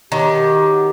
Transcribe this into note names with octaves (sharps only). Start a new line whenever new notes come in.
D#3 F#3 G4